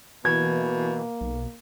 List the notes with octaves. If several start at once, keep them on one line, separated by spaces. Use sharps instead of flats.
B2 E3 A#3 G#6
B1